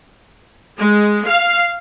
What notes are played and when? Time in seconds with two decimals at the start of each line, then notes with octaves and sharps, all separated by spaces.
0.78 G#3
1.25 F5